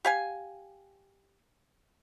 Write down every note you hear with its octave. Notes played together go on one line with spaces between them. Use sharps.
G4 F5 G#5